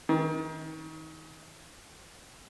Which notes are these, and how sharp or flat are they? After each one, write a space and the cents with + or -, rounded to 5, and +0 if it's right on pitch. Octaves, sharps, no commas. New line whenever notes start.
D#3 +30